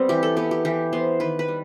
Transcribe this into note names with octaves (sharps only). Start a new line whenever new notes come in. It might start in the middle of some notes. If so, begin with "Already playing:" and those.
Already playing: G3 B3 C4
E3 G4
A4
B3 G4
G4
E3 G4
B3 C5
D#3 B4
B4
G3